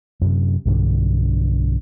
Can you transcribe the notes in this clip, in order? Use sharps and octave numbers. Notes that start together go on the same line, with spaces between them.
F#2 C3
B1 G2 D3